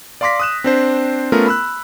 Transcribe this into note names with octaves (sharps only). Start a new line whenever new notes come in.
D5 F5 C6 D6 A#6 B6
D#6 F#6 E7
C4 D4 C5
A3 B3 C#4 F4 A#4
B5 E6 F#6